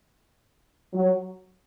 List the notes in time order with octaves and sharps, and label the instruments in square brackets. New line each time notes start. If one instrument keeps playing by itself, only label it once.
[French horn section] F#3